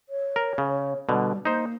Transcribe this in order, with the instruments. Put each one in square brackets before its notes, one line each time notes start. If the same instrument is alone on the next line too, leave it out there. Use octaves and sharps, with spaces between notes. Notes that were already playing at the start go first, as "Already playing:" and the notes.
[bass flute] C#5
[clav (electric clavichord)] A#4
C#3
[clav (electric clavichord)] B2 D3 [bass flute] G3
[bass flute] A#3 [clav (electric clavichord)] D#4 C5